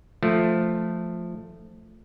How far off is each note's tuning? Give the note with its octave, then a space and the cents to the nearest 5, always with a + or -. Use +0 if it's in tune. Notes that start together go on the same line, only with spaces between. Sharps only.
F3 +0 A3 +5